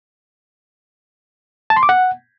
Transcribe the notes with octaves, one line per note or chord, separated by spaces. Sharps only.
A5
C6
D6
F#5